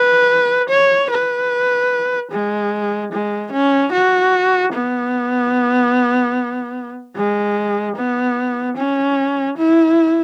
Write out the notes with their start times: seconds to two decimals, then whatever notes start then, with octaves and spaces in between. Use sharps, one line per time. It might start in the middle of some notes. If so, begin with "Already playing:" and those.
Already playing: B4
0.69 C#5
1.10 B4
2.31 G#3
3.12 G#3
3.52 C#4
3.92 F#4
4.73 B3
7.16 G#3
7.96 B3
8.77 C#4
9.58 E4